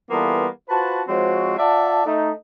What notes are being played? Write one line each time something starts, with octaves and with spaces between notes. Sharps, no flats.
E3 G3 A#3 B3 F4 A4
F4 F#4 B4 C5 A5
F3 G#3 C4 F#4 C5 C#5
F4 D5 E5 F#5 A5
A3 D#4